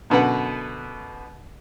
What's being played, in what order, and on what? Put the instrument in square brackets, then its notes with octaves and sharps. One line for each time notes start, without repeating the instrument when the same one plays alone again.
[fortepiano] F#2 B2 D3 B4 F#5